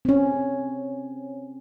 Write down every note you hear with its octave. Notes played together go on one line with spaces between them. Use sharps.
C4 C#4